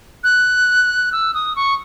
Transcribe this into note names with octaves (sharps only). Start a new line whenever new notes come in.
F#6
E6
D#6
C#6